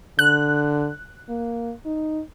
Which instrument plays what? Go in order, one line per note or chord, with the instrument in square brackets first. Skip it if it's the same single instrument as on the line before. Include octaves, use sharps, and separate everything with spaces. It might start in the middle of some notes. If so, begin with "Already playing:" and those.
[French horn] D3 [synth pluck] F#6
[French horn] A#3
D#4